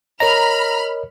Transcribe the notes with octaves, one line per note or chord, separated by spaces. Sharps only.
A#4 C#5 D#5 A#5 B5 F6